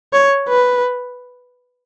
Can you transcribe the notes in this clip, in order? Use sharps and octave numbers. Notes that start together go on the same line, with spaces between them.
C#5
B4